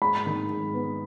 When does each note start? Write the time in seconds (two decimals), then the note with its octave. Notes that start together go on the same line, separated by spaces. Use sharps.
0.02 G#2 B5
0.26 D#3
0.50 G#2
0.74 B3